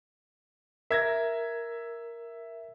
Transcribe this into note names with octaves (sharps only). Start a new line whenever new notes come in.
A#4 E5 G#6 A#6